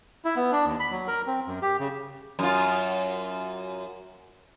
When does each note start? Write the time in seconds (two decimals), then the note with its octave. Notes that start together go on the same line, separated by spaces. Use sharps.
0.25 E4
0.36 B3
0.52 D4
0.66 D#2
0.80 B5
0.91 F#3
1.08 A#4
1.27 C4
1.47 F#2
1.62 G4
1.79 C#3
2.39 F#2 F4